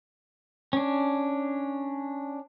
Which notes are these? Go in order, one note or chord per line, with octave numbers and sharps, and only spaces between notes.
C#4 D4